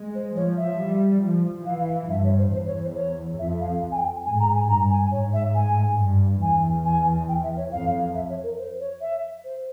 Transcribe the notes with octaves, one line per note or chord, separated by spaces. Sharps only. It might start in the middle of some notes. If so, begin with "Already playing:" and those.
Already playing: G#3
C5
F3 C#5
E5
G3
F3
E3 F5
G2 E5
C#5
C5
E2 C5
C#5
C5
C#5
F2 E5
F5
G#5
G5
G#2 G#5
A#5
G#5
G2 A#5
G#5
G#2 C#5
E5
G#5
G2
E2 G#5
G#5
G5
E5
C#5
F2 F5
E5
C#5
A#4
C5
C#5
E5
C5